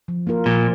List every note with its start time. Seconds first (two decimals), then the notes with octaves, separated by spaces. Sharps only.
0.08 F3
0.27 A#3 F4 A#4
0.46 A#2 F3